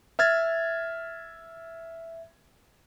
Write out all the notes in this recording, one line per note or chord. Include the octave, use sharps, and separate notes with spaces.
E5 F6 G#6 A6